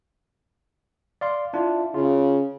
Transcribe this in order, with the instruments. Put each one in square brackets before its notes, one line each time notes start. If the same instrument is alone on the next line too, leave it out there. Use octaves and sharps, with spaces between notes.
[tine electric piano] D5 F5 C6
[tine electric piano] D4 F4 [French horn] E4
[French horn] C#3 [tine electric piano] F4